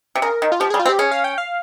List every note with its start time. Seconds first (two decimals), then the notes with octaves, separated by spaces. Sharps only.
0.15 C3
0.22 C#3 A#4
0.42 D#3
0.52 F4
0.60 F3 G4
0.70 G3 G#4
0.79 F4
0.86 C4
0.89 G4
0.99 C#4 G#4
1.11 F5
1.24 G5
1.38 F5